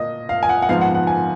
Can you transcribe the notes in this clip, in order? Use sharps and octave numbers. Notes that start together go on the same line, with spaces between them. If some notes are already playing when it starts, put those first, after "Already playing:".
Already playing: A#2 D#5
F5
G#5
F#5
F#5
G#2 F3 B3 F5
F#5
F#5
G#5